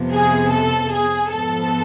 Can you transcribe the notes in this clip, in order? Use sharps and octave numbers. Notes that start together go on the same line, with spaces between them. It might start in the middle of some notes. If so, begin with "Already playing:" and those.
Already playing: F2 C3 F3 B3
G#4
A4
G#4
G#2 F3 B3 A4